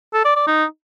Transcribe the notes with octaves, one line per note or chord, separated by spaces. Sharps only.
A4
D5
D5
D#4